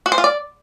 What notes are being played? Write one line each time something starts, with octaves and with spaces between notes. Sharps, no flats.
F#4
C5
F4
D5